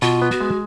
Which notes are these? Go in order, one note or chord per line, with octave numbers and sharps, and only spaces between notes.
B2 F4
B3
F#4
G#3